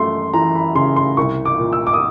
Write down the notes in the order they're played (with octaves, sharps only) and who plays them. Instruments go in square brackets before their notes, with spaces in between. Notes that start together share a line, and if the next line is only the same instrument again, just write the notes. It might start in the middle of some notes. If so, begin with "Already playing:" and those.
Already playing: [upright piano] F#2 A3 C6
E3 A#5
B5
C#3 C6
C6
C2 C#6
D6
A#2
E6
D6
D#6